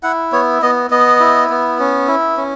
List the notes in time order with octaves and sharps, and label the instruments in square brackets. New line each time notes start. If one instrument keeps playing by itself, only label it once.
[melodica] E4 F#5
B3 C#5
B3 D#5
B3 D#5
E4
B3
C#4
E4
C#4